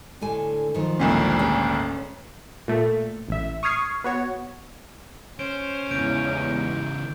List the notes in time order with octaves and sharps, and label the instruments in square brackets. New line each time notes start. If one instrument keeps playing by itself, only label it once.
[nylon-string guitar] A2 D3 G#5
D#3 F3 F#3
[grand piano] G#1 D2 A#2
[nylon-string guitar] C#4 G#4 B4
[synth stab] A#2 A3
A1 E5
C#6 D#6 F6 G#6 C7
B3 F#4 C#5
[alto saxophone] C#4 [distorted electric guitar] C5 [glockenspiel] D7
[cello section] E2 G#2 [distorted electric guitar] C#3 E3 [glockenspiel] G6 D7